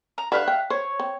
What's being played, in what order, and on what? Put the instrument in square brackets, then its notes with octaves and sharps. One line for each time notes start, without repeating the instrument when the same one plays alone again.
[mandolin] A#5
[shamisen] D3 G3 B4 [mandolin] E5 F5 F#6
[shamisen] G5
[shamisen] C5 [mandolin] C#5
[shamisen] C4